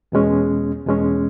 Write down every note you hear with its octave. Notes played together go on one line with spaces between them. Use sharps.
E2 B2 G#3 C#4
E2 B2 G#3 C#4